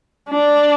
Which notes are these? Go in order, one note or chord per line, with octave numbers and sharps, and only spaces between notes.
D4